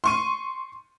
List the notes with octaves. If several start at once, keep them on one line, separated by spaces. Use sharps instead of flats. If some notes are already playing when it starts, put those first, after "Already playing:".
C6 C#6 D#7